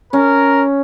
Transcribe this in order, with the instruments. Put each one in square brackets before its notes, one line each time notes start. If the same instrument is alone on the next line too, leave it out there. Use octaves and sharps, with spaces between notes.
[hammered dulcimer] C#4 [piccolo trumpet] A#4